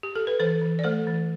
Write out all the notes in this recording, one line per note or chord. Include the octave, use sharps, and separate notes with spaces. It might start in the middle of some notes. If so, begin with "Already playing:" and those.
G4
A4
B4
E3 A4 C5
E3
D5
A3 A4 C5
E3